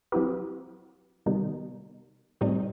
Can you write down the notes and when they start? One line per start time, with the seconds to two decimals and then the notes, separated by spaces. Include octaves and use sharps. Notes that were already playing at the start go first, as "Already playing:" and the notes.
0.12 F#3 C4 E4 G4 B4
1.26 C3 D#3 G3 B3 D#4
2.41 A2 G3 C4 D#4